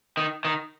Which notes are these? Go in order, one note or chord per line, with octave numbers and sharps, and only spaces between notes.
D#3
D#3